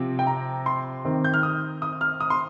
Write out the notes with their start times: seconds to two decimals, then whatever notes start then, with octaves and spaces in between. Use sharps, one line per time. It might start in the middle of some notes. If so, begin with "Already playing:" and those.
Already playing: C3 F3 C4
0.19 G5
0.27 A#5
0.66 C6
1.05 D#3 C4
1.24 G6
1.34 F6
1.43 D#6
1.82 D#6
2.01 F6
2.20 D#6
2.30 C6